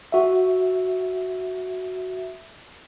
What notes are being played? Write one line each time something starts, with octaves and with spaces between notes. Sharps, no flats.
F#4 E5